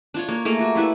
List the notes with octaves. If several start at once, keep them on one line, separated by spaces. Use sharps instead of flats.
D4 F4 C#5
A#3 C#5
A3 A#3 G#4 A#4
F4 F#4
G3 E4 B4 E5